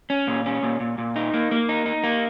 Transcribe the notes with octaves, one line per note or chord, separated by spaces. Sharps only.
C#4
A#2
C#4
A#2
A#2
A#2
D#4
A#3
A#3
D#4
D#4
A#3